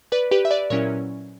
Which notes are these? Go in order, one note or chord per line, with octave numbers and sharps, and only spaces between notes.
B4 D5
G4 B4
E5
B4 D5
A#2 F#3 C#4 E4 A#4 C#5